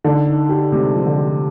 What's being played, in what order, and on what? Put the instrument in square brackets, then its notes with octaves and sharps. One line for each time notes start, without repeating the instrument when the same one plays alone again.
[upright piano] D3 [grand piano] D#4
[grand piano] D#4
G4
[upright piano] C3 [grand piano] G#3
[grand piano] F3
[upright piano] D3
[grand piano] G4